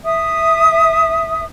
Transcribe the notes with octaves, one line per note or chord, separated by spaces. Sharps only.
E5 D#6